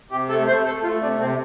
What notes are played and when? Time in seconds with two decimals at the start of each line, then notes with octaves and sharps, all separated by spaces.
0.11 C3 G4
0.29 A3 A4
0.47 A3 C5
0.65 A3 A4
0.83 A3 F4
1.01 C3 D4
1.20 C3 C4